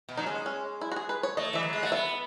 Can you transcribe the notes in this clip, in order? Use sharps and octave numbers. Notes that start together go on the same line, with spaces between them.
B2
F#3 D#4
G#3 C#4
C#4
E4
F#4
G#4
B4
C#5
A3 D#5
E3 E5
F#3
G#3
A3 F#5
B3 E5